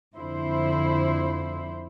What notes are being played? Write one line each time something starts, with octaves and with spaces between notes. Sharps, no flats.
F2 D3 E4 C5